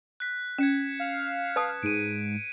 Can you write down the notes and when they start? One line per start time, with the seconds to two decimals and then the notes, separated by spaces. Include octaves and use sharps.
0.20 F#6 B6
0.58 C#4 G#6 C#7 E7
0.99 F5
1.56 B4 A5 D#6
1.83 G#2 D7 D#7